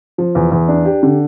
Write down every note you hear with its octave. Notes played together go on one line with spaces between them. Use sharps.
F3
E2
E2
D4
G4
D3